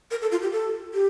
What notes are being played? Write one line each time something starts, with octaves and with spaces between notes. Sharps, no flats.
A#4
A4
F4
G4
A4
G4